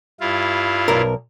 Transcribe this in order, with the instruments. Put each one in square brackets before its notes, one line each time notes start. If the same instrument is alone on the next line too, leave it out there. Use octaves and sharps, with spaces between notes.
[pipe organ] G2 E4 F4
[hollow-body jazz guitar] B1 A#4